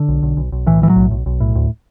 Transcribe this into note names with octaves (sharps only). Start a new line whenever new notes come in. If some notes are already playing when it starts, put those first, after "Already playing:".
Already playing: D3
B1
B1
B1
B1
A2 E3
A2 E3
F#3
B1
B1
B1
A2
D2